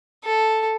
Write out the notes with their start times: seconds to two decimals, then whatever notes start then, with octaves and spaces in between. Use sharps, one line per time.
0.24 A4